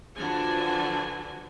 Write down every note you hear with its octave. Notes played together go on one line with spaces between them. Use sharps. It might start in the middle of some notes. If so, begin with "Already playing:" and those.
D3 E3 F3 D4 F#4 G#5